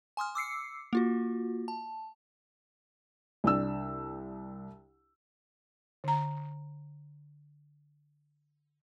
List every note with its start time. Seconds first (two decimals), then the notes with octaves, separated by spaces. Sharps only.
0.17 G#5 C6 D#6 F6
0.35 D6 E6 C7 C#7
0.93 A#3 F4 F#4
1.68 A5
3.44 C2 D4 E6
6.04 D3 A#5